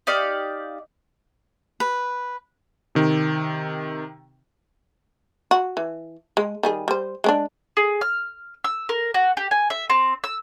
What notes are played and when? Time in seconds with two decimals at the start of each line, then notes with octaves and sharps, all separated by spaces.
0.07 D#4 G4 D5 F5
1.80 B4
2.95 C3 D#3
5.51 F#4
5.77 E3
6.37 G#3
6.63 D#3 G3 G#4
6.88 G3 C5
7.24 G#3 C#4 D4
7.77 G#4
8.01 F6
8.64 E6
8.89 A#4
9.14 F#4
9.37 G4
9.51 G#5
9.70 E5
9.90 C4
10.24 E6